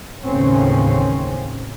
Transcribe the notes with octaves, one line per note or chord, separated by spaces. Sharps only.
A1 D#2 A2 C#3 C4 C#4